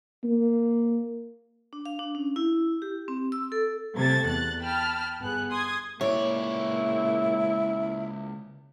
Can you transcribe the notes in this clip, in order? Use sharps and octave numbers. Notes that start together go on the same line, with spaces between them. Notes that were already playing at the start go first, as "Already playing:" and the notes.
A#3
D4
F5
D4
C#4
E4
G4
C4
E6
A4
C3 A3 G4 A4 G#6 A6
E2 F#6 A6
G5 A5 B5 F6
G1 B3 G#4 F#6
C6 D#6 G#6
C#2 A#2 E4 C#5 D5